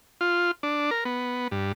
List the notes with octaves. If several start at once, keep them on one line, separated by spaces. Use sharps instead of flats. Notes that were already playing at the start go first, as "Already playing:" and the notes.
F4
D4
A#4
B3
G2